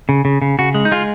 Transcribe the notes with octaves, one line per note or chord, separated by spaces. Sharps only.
C#3
C#3
C#3
C#3 F#4
G#3
D#4
G#3 F4